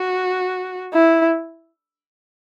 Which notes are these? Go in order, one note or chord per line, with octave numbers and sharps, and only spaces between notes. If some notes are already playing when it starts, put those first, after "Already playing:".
Already playing: F#4
E4